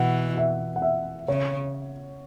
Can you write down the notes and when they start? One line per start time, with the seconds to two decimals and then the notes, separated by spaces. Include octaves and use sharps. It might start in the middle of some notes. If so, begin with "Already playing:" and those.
Already playing: B2 E3 F#5
0.37 E5
0.76 F#5
0.82 E5
1.28 C#3 C#5